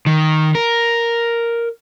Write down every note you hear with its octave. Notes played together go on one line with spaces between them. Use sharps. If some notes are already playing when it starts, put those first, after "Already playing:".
D#3
A#4